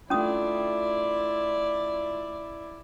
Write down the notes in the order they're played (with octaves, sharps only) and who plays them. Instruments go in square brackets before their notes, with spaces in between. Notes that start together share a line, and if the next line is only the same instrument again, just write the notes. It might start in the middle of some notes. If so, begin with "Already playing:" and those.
[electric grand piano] A3 D4 F4 [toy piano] C#4 D#6 [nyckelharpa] E4 D5